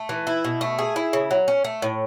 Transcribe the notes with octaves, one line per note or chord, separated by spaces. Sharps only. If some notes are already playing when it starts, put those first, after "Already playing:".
Already playing: A3
E3
E4
B2
A3
G#4
E4
C#3
F#3
C#4
A3
A2